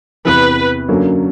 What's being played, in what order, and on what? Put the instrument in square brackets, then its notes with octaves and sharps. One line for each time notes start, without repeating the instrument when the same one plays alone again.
[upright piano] E2 C3 E3 [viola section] B4
[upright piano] F#2 D3 F#3 A#3 C#4